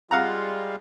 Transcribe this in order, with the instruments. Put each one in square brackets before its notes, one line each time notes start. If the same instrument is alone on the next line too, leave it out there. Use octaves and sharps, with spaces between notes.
[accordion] G3 G#3 F4 [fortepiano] F5 F#5 A#5